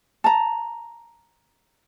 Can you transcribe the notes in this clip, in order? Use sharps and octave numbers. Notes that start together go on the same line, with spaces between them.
A5 A#5